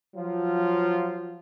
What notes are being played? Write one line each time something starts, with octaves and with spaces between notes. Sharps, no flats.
F3 F#3 F4